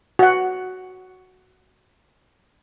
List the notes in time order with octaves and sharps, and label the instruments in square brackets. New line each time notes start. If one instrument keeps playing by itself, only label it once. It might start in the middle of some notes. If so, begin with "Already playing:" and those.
[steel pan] F#4 F#5